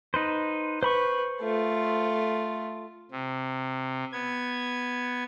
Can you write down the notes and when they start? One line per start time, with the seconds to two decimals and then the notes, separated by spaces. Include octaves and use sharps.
0.14 D#4 B4 C5
0.83 B4 C5 B5 C#6
1.42 A3 F4
3.11 C3
4.13 B3 G#6